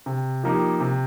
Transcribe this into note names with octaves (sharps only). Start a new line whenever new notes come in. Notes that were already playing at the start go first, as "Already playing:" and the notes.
C3
F3 A#3 D#4 G4
C3